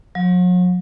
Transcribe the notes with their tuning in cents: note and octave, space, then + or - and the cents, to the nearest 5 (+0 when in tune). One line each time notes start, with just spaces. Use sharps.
F#3 -45